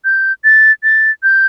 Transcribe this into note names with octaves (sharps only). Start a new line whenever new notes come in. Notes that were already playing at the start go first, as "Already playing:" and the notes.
G6
A6
A6
G6